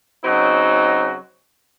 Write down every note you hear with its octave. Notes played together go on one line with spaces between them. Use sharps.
C#3 F#3 C4 D#4 F#4